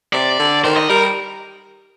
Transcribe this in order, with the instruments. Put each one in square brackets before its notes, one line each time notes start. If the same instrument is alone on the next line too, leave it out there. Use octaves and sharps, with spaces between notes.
[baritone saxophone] C3 [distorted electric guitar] D5
[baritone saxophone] D3
[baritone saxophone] D#3 [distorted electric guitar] C5
[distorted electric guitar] D#5
[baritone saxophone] G3 [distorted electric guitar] A#4